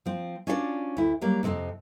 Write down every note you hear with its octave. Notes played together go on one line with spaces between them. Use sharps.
F3 C4
C#4 D4 F4 F#4 C5 D5
D2 E4
F#3 G3 A#3
F2 C3 C4 C#4 D#4